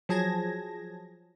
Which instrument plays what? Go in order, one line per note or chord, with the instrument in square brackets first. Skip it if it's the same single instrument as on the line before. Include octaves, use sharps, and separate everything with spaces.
[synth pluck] F3 F#3 G#4 A5 G#6 A#6